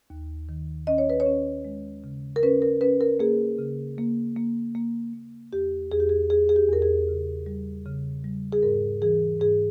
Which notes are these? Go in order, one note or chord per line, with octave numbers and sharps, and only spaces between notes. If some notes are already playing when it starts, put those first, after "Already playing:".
D#2
D#3
C#4 D#5
C#5
B4
C#5
C#4
G#3
C#3
A#4
C#4 B4
A#4
C#4 B4
A#4
A#3 G#4
C#3
A#3
A#3
A#3
A#3
E2 G4
E2 G#4
G4
G#4
E2 G#4
G#4
G4
E2 A#4
G#4
C#3
G3
C#3
G3
G#4
G#2 A#4
E3 G#4
G#2 G#4